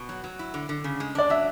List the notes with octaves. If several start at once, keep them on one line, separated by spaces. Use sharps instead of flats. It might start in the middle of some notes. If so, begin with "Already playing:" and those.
Already playing: B2
F#3
F#3
E4
D3
D3
C#3
G#3
D4 D5
F#3 E5